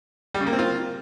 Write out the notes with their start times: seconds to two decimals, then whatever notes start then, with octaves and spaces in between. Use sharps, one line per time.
0.34 G3
0.41 C#3
0.47 A#3
0.53 C4
0.59 F4